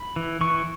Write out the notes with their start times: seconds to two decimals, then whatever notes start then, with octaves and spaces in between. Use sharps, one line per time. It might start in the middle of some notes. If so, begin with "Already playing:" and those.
Already playing: B5
0.16 E3
0.41 E3 C#6